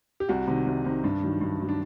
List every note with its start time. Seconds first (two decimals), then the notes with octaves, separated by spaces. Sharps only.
0.20 G4
0.29 C2 F#4
0.47 C3 D#3
0.67 C2
0.85 C3 D#3
1.04 G2 D4
1.23 D#3 F#3
1.41 G2
1.60 D#3 F#3
1.69 D4